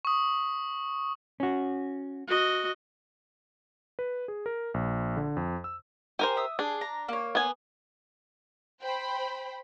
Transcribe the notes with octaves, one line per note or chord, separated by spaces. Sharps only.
C#6 D#6
C#4 F#4
F#4 D#5
B4
G#4
A#4
A#1
D3
F2
E6
G4 A#4 C5 G#5
E5 D#6 E6
D4 G#4
A#5
A#3 C#5
B3 G#5
C5 G5 B5